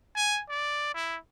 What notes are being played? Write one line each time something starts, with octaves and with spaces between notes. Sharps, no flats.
G#5
D5
E4